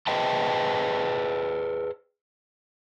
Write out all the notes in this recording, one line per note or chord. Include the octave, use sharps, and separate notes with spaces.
G#4 B4 C5 D#5 G5 A5